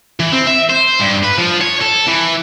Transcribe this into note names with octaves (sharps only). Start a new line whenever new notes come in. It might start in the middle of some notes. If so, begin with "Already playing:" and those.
E3
C4
E5
C5
G2
B4
F3
C#5
A4
E3